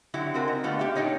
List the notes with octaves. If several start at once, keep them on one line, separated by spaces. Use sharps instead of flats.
D3 F#3 E4 F#4 G4
C#3 C4 F#4 A#4
D#4
D3 A3 B3 F4 G4
G4 E5
A#2 D4 D#4 C#5